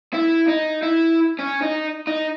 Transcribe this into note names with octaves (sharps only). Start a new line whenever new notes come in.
E4
D#4
E4
C#4
D#4
D#4